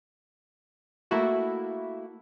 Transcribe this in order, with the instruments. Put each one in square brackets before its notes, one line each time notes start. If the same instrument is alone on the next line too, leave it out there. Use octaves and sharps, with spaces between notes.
[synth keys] A3 A#3 E4 F#4